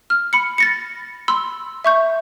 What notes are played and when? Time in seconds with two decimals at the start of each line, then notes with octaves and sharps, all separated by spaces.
0.10 F6
0.33 B5 C#7
0.58 A6 A#6 C#7
1.28 B5 C6 E6
1.84 E5 C#6 G6